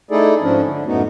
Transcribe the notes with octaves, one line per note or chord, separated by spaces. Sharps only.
A3 D#4 E4 G#4 A4 D5
G#2 F3 C#4 D4
D3
F#2 A2 A3 B3 D#4 F#4